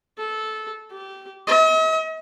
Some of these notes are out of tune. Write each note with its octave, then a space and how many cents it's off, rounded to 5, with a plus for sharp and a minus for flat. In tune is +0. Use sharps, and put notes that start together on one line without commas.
A4 -15
G4 -20
D#5 +45